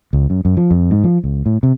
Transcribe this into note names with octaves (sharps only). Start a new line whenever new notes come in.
C#2
F#2
F#2
F3
F2
G#2
F3
C#2
A2
C3